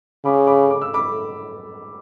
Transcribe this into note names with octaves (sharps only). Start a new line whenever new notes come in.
C#3 B5 D6
B5 D6
D6
E6
B5 D6